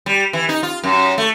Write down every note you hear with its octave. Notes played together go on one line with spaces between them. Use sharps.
G3
E3
D#4
F4
F#2
A3